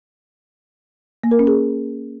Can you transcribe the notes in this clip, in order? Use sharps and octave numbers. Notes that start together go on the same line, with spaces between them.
A#3
A#4
C#4
G#4